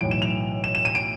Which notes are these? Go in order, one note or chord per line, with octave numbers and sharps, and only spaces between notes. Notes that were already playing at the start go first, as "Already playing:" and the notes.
B1 A2 E3 D7
E7
F7
E7
E7
D#7
D7